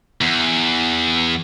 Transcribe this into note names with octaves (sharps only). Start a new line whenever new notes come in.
E2